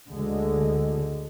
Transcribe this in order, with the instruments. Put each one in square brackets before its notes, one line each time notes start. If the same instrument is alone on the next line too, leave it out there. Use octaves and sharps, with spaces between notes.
[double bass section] D2 D3 G#3